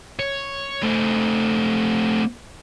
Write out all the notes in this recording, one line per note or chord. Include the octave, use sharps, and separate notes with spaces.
C#5
A3 C4